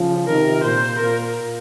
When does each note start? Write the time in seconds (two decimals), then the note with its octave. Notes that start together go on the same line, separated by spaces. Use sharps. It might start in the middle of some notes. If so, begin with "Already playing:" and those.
Already playing: C#3 F3
0.28 C3 D#3 A#4
0.63 A#2 C5
0.99 A#2 A#4